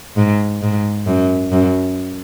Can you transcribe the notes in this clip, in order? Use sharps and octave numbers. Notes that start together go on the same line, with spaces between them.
G#2
G#2
F#2
F#2